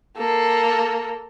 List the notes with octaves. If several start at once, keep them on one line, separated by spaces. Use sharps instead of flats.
A#3 A4